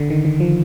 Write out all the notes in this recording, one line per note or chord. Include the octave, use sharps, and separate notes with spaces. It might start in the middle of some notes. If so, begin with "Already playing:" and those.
Already playing: D3
D#3
D#3
F3